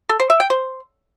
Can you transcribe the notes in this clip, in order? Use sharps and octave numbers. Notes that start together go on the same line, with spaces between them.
A4
C5
E5
G5
C5